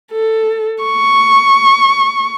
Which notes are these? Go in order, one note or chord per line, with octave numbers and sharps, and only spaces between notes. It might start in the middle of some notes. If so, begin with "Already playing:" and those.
A4
C#6